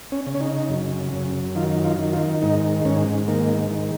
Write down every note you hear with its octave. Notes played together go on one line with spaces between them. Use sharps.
C#4
C#3
C#4
D#4
F#2
F#2
D#3 F4
F4
D#3
F4
G#2 D#4
G#2 C#4
D#3 A#3
D#3